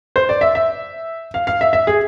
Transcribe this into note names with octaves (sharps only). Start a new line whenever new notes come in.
C5
D5
E5
E5
F5
F5
E5
E5
G#4